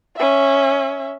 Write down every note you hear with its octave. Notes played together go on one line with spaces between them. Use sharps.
C#4 E5